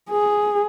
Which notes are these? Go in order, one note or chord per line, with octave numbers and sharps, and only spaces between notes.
G#4